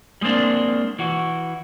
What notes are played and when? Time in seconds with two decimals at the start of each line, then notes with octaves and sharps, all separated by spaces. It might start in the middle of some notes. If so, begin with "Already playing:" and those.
0.21 G3 G#3 A#3 C4 D4
0.99 E3 F#4